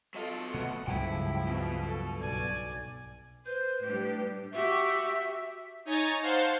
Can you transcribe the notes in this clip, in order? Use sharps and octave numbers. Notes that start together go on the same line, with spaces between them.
F#3 F4 A4 D#5
B2 A3 B3 F#5
C#2 G2 F3 F#3 C#4 E4 G5
B2
A4
B1 D5 G#5
B4 C5 G6
A2 G3 D4 G4
F#4 G4 E5
D#4 C#5 G#5 A#5 G#6 A6
C5 F5 F#5 A5 C6 G6